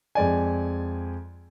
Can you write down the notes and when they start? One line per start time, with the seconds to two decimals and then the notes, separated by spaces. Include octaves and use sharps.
0.15 F2 G#3 D5 G#5